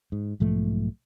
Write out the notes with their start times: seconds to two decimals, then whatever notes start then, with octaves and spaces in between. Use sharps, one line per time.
0.12 G#2
0.40 B1 G#2 F3 A3